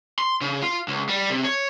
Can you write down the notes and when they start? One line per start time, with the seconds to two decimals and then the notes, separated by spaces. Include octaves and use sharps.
0.19 C6
0.41 C#3
0.62 F4
0.88 C#2
1.09 G3
1.30 C3
1.44 C#5